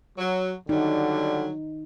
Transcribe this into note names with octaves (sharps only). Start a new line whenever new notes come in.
F#3
D3 F#3 G3 D#4